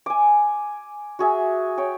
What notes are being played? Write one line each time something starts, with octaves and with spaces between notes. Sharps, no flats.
G#5 D6
F#4 G#4 E5
C#5 G5